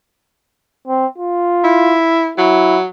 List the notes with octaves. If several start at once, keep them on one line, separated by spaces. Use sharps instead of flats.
C4
F4
E4
F#3 E4